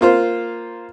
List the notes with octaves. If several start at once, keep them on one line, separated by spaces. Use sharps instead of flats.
A#3 F4 C5